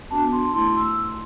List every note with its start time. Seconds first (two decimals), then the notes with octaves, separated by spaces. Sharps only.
0.10 B3 D4 F#4 A5
0.32 C6
0.54 A3 E4 C6
0.76 E6